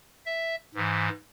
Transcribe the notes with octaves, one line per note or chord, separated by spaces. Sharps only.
E5
G#2 E3